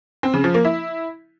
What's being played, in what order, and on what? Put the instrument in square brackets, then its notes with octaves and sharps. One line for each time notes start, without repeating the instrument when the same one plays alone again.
[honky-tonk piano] C4
C#3
F3
A#3
E4